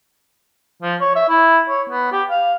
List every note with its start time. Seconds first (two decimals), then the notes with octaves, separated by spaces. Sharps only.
0.82 F3
1.01 C#5
1.16 E5
1.29 E4
1.69 C#5
1.89 B3
2.12 G4
2.30 F5